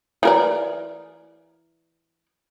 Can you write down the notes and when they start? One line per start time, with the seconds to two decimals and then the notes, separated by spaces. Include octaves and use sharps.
0.23 E3 A#4 D5